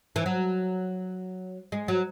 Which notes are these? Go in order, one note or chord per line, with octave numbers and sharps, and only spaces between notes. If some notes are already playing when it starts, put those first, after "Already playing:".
E3
F#3
G#3
F#3